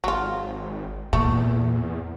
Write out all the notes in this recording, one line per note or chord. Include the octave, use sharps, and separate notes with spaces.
G#1 F#3 F4
E2 A#2 A3